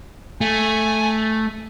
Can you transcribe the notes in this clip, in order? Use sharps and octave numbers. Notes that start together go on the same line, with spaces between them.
A3 G#5